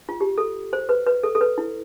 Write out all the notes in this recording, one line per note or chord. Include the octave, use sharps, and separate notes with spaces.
F4
G4
A4
C5
B4
B4
A4
A4
B4
E4